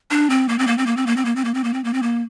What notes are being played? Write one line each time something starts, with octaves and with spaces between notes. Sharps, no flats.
D4
C4
A#3
C4
A#3
C4
A#3
C4
A#3
C4
A#3
C4
A#3
C4
A#3
C4
A#3
C4
A#3